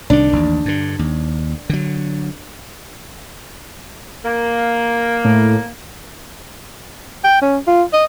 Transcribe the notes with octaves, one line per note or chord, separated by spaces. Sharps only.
C2 D#3 D4
A1 D#2
G2 D3
D#2
D3 F#3
A#3
A2
G5
C#4
F4
D#5